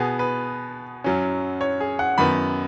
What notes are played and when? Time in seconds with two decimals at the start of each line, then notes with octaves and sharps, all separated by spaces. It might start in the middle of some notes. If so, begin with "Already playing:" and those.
Already playing: B2 B3 G#4
0.19 B4
1.04 F#2 F#3 C#4
1.61 C#5
1.80 G#4
1.99 F#5
2.18 F#2 D#3 B3 B5